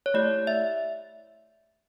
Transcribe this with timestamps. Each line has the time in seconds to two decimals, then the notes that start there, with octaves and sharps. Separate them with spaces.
0.06 C#5
0.14 A3 E4 G4 D5
0.47 E5